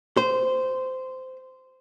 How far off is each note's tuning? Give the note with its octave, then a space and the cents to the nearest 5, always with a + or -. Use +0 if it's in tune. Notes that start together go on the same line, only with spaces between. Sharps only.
C5 -15